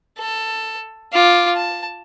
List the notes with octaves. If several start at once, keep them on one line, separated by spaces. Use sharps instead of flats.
A4
F4 D6
A5